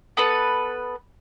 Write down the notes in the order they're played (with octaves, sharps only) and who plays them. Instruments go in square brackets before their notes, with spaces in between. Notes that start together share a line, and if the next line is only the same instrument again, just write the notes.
[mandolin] B3 A4 B4